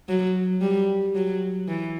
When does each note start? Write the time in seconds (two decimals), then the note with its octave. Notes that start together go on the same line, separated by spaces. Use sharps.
0.08 F#3
0.61 G3
1.15 F#3
1.68 E3